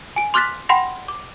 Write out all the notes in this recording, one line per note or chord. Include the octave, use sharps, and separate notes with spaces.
G#5 D7
C6 D6 F6 F#6 A6 B6
F#5 G5 B5 C6 A#6
D6